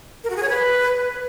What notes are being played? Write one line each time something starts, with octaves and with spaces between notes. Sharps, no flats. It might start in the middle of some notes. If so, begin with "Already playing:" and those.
A#4
F#4
G#4
C#5
B4